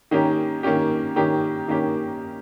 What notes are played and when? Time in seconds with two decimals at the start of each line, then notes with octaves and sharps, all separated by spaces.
0.11 D#3 A#3 C#4 G4
0.63 D#3 A#3 C#4 G4
1.16 D#3 A#3 C#4 G4
1.68 D#3 A#3 C#4 G4